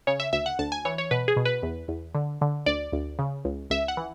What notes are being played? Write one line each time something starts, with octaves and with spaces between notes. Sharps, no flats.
C#3 C#5
E5
D2 E5
F#5
D2 A5
G#5
E3 C#5
C#5
B2 B4
G#4
B2
B4
E2
E2
D3
D3
D2 D5
D2
C#3
C#2
C#2 E5
F#5
E3